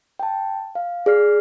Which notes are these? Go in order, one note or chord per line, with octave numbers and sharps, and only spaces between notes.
G5 A5
F5
G#4 D5 F6 C7